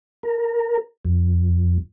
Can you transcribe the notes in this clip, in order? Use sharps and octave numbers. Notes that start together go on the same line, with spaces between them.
A#4
F2